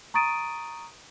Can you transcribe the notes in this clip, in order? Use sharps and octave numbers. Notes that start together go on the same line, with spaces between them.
A#5 C#6 D#6 A6 D7 D#7